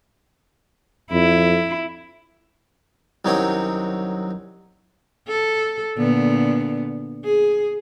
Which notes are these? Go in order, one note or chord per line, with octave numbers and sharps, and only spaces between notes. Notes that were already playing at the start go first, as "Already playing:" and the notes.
F2 E4
C2 D#3 F#3 C4 C#4 C#5
A4
A#2 D3 B3
G#4